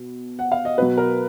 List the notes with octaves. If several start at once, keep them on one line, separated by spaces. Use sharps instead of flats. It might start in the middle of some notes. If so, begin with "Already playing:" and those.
Already playing: B2
F#5
F5
D#5
B2 F#3 B4
A#4